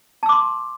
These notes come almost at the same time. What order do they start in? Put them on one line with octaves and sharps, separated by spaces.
A5 E6 D6 C6